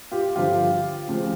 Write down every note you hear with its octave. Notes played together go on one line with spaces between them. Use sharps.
F4 G4
G2 D3 F3 F4 G4
D2 C#3 F3